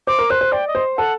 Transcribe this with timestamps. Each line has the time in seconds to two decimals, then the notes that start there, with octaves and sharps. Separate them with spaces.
0.07 C5 D6
0.19 A#4
0.30 C5 F#6
0.41 C5
0.52 D5 G5
0.68 D#5
0.75 C5
0.97 A4 F#5